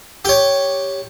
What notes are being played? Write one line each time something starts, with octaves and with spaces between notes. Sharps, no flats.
G4 C#5